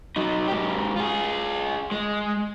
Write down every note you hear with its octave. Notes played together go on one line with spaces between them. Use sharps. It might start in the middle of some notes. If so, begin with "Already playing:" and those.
F#3 D#4
G#2 G4
F4 G#4
G#3